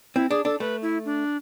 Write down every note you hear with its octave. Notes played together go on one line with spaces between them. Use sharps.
C4 E4
D4 G#4
D4 A4
A3 B4
E4
D4